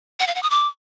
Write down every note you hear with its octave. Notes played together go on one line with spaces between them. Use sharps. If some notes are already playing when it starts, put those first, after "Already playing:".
F#5
F5
F#5
D#6
D6